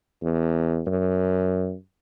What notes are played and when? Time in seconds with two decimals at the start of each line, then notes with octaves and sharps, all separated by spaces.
0.23 E2
0.87 F#2